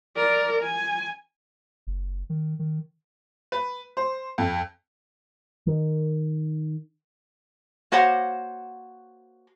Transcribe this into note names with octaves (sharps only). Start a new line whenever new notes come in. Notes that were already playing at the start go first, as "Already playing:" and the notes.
A#4 D5
G#5
F#1
D#3
D#3
B4
C5
F2
D#3
A#3 F#4 C5 C#5 F#5